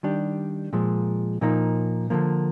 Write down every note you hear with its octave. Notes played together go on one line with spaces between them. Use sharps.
D#3 G3 D4 G4
A#2 F3 G#3
A#2 F3 A#3 D#4
D3 F3 A#3